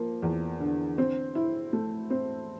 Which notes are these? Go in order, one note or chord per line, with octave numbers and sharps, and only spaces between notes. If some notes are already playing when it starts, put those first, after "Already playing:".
Already playing: F3 A#3
E2
D3
C4
E4
A3
C4